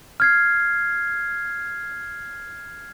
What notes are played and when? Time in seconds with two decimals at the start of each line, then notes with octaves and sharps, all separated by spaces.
0.20 F6 G#6 C7